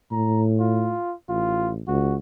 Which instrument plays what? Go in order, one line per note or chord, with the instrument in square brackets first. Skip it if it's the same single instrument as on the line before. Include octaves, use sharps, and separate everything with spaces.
[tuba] A2 [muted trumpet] A#5
[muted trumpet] F4
[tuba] A1 [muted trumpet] F4
[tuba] C#2 [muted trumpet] F#4